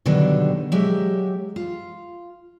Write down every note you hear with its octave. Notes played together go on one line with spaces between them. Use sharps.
B2 D3 D#3 F#3 G3
F#3 G#3 G4 E5
F4